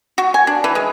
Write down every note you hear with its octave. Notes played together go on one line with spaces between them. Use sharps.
F#4
G#5
D4
E3
G#3